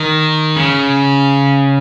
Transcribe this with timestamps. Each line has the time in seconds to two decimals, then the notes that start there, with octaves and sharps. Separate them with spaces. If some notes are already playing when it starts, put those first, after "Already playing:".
Already playing: D#3
0.56 C#3